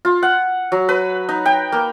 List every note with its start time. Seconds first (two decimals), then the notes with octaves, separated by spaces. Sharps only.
0.05 F4
0.23 F#5
0.72 F#3
0.89 B4
1.29 D#4
1.45 G5
1.72 A#3